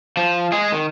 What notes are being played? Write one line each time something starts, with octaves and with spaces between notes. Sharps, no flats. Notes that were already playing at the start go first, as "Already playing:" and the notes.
F3
G#3 G#4
D#3